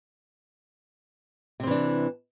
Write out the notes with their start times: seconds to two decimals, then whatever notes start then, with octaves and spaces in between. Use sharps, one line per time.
1.60 C3
1.63 C4
1.67 E3
1.71 D4